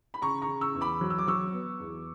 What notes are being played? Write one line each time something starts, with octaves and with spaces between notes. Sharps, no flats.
B5
C#3 A#5 C#6
A#5 C#6
C#3
C#6 E6
E2
B5 D6
F#3
E6
D6
F#3 C#6 E6
B3
E2